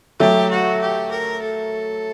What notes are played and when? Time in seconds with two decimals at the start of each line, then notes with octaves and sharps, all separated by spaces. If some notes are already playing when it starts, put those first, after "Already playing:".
0.19 F#3 A3 G4
0.50 F#4
0.81 G4
1.11 A#4
1.42 A4